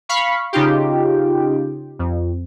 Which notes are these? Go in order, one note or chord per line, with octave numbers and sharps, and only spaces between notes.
F5 B5 C#6
C#3 D#4 F4 G4
F2